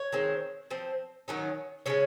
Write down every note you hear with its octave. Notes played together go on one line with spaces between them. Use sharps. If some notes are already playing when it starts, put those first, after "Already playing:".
Already playing: C#5
D#3 G#3 C4
F3 C4
D#3 F#3 C#4 D#4
C#3 F3 G#3 C#4